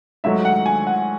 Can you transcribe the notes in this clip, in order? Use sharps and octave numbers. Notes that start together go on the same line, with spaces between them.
G#2 F#3 A3 E5
F#5
G#5
F#5